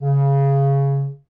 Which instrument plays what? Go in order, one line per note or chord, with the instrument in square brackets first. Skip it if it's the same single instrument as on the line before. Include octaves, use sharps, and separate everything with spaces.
[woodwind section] C#3